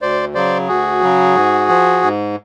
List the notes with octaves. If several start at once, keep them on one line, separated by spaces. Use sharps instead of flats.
D2 C5 D5
C#3 F#3 C5 D5
D2 F#4 G#4
C#3 F#3
G#2
F3
G#2